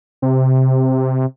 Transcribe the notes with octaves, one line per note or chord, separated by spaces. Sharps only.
C3